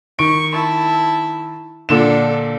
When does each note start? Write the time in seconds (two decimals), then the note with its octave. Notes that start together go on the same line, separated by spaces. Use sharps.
0.19 D#3 C#6 D7
0.53 E4 A5
1.89 A#2 D3 D4 A4 E7